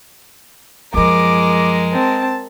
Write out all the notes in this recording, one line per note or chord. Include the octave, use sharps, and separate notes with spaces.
F#2 F3 G#3 A#4 D6
C4 A5